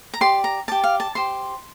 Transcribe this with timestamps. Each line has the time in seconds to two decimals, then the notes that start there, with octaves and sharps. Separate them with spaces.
0.14 A#5
0.21 G4 D5 C6
0.44 A#5
0.68 G4 D5 A5
0.84 F5
1.00 A5
1.15 G4 C5 C6